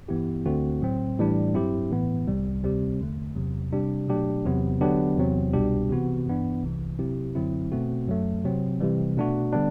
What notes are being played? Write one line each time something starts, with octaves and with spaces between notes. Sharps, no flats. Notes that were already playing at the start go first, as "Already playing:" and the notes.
G2 E3 B3 E4 G4
D2 D3 A3 C4 F#4
A2 F#3 C4
A2 E3 G3 D4
G2 F#3 C4 E4 G4
A2 E3 B3
C2 C3 G3
D2 C3 G3 C4 G4
E2 D3 A3
E2 C3 F#3
C3 G3 D4 G4
B2 F#3 A3 D4 G4
E2 C3 F#3 B3
D3 F#3 B3 D4 G4
E2 C3 F#3 C4
C2 B2 G3 D4 G4
C3 E3 B3 F#4
G2 E3 B3 D4
C2 C3 E3
C3 F#3 C4 E4 G4
F#2 D3 F#3 C4 E4
B2 A3 C4 F#4
F#2 F#3 A3
C3 F#3 C4
C3 E3 G3
B2 A3 D4 F#4
D3 G3 B3 D4